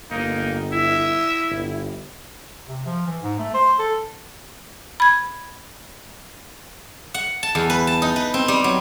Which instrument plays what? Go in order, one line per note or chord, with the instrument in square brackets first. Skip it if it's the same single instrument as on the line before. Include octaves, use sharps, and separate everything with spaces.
[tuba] G1 [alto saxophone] A#3 [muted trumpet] D#4
[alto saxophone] E4 [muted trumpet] E5
[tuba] G1
[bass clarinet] C3
F3
E3
G#2
A3
C5
A4
[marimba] B5 G#6
[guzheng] F#5
A5
E2
B4
A5
D#4
B4
C4
G3
F#3